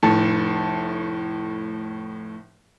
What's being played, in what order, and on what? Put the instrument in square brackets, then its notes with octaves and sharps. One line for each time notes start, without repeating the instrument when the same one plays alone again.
[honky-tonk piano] F1 A2 A3 A5